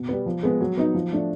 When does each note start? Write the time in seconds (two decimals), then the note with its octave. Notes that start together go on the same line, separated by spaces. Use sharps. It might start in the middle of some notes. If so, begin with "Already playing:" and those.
Already playing: B2
0.09 G3 B3
0.26 F3
0.43 G#3 B3
0.60 F#3
0.77 B3 D#4
0.95 F3
1.12 A3 D4